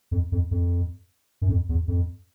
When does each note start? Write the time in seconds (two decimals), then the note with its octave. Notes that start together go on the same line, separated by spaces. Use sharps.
0.11 F2
0.32 F2
0.51 F2
1.41 F#2
1.49 F2
1.69 E2
1.88 F2